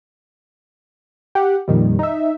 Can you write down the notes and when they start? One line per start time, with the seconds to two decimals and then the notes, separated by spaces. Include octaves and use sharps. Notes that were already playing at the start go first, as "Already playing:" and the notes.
1.35 G4 F#5
1.68 F2 A#2 D#3 G3
1.99 D#4 E5